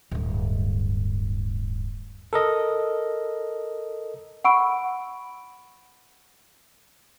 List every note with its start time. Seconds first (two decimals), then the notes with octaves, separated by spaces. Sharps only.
0.11 D1 G2
2.33 A4 A#4 D#5
4.44 F#5 B5 C#6 E6 D7